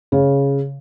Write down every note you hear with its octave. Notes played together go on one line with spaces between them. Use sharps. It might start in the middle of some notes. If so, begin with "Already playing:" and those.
C#3